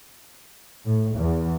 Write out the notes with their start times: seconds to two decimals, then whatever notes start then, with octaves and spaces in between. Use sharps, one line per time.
0.85 A2
1.16 E2